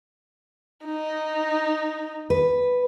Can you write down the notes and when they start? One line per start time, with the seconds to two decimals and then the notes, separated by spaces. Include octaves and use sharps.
0.86 D#4
2.30 B4